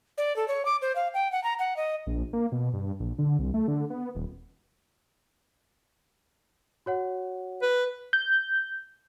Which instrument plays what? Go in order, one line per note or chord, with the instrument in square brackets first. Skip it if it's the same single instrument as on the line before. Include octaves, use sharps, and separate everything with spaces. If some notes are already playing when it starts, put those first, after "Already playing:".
[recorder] D5
A4
C#5
D6
C5
F5
G5
F#5
A#5
F#5
D#5
[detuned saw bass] A#1
A#3
B2
G2
A#1
D3
C2
A3
D3
B3
D#1
[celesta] F#4 C#5 F#5
[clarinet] B4
[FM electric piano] G6